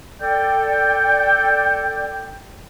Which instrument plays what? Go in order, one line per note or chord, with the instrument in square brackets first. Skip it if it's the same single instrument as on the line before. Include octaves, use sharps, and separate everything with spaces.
[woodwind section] A4 D5 G5